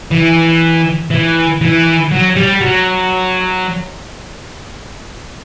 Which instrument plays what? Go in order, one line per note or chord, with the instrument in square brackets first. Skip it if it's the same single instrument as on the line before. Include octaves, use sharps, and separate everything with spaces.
[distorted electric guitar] E3
E3
E3
F#3
G3
F#3